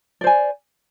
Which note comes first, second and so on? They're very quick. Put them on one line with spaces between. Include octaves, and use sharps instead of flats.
D5 C5 G#5